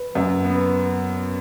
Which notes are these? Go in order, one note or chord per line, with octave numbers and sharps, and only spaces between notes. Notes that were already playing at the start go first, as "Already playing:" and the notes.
Already playing: B4
F#2
B3